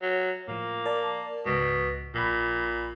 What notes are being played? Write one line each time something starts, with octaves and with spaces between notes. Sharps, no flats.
F#3
A2 F3 A#3
A#4 D5 A5
C#2 G#2 B2
A#1 A#2 B5